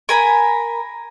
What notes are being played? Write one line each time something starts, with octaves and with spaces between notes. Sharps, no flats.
A#4 G#5 B5